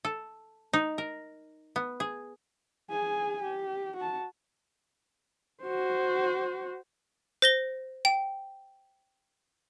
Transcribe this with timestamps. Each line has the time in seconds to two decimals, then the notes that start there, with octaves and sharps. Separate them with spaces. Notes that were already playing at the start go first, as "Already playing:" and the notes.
0.05 A4
0.73 D#4
0.98 A#4
1.76 B3
2.00 G#4
2.90 G#4 G#5
3.42 G4
3.96 F#4 A5
5.63 F#4 C5
7.42 C5 A#6 G7
8.05 G5